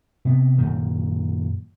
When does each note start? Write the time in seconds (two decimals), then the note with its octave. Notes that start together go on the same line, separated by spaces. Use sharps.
0.25 C3 B3
0.58 F#2 A#2 D#3